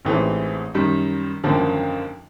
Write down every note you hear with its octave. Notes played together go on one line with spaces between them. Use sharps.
A1 G#2 E3 A3 C4
F#2 D#3 G3
G#1 F#2 D3 F3 A#3